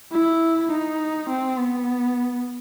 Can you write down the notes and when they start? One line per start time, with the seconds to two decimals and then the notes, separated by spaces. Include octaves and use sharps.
0.12 E4
0.71 D#4
1.29 C4
1.59 B3